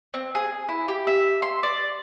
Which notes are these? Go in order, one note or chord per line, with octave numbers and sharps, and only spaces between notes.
C4
G#4
E4
G4
E5
C6
D5